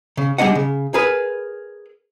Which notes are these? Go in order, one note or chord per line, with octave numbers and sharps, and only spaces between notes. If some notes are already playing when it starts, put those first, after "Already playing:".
C#3
G3 G#3 D4 D#5 F#5
C#3
G#4 A#4 B4